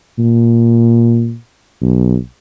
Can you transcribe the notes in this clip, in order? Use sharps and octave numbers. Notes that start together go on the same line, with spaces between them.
A#2
B1